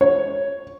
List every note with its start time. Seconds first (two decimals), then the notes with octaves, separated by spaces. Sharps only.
0.01 C#5